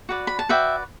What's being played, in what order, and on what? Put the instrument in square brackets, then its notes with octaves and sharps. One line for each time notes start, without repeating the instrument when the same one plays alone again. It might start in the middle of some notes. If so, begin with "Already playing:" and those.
[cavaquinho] F#4 B4 D5
B5
A5
F#4 B4 D5 E5 G5